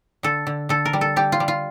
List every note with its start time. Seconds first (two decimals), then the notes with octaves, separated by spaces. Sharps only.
0.23 D3 A4
0.47 D3
0.69 D3 A4
0.85 A#4
0.93 G3
1.01 A4
1.16 G3 G4
1.32 F4
1.40 G3
1.48 F4